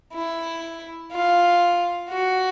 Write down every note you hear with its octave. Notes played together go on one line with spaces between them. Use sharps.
E4
F4
F#4